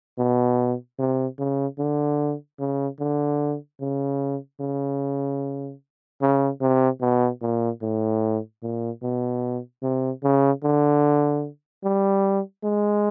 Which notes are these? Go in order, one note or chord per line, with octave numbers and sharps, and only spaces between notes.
B2
C3
C#3
D3
C#3
D3
C#3
C#3
C#3
C3
B2
A#2
A2
A#2
B2
C3
C#3
D3
G3
G#3